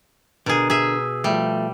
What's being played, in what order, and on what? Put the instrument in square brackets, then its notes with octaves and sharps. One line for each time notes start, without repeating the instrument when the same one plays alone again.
[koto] B2 G#4 [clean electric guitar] D3 A#4
[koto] G#4 E5
[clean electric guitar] F3 A3 [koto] G3